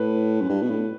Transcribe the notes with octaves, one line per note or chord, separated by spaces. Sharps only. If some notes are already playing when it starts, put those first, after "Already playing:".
Already playing: A2 B4
F#2
G2
B2
A2